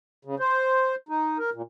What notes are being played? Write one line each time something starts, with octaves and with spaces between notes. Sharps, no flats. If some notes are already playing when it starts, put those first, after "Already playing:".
C#3
C5
D#4
A#4
A#2